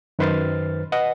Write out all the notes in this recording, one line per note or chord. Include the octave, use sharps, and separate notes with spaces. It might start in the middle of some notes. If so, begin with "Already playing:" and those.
F#2 D#3 B4 C5 F6 A6
B4 D#5 F#5